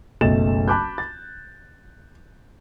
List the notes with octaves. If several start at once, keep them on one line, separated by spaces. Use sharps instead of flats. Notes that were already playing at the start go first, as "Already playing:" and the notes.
F#1 B1 A3 D#5 A6 E7
A5 B5 D6 F#6 G6
A6